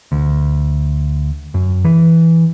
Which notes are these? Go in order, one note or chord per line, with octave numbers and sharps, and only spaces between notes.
D2
F#2
E3